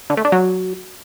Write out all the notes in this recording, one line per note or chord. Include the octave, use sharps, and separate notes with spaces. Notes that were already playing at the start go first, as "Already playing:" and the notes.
D3
A3
D4
F#3